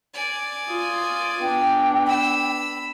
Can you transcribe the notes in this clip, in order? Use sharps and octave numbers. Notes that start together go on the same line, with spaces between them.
D5 G#5
F4 D#6
B3 D4 G5
B5 E6